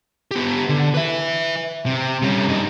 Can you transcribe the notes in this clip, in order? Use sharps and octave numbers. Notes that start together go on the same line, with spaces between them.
B3 G4
D3
B4 E5
C3
G3 C#4
G2 D#4